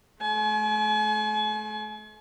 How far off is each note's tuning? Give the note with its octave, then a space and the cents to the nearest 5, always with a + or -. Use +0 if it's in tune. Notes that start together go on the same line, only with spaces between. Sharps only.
A3 -40 G#5 +40